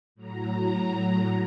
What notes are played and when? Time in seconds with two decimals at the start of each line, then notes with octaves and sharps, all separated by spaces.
0.15 A2 F#3 A#5